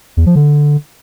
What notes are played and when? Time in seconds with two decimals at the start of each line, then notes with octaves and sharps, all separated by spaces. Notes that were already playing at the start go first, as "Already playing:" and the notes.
0.17 E2
0.26 F3
0.36 D3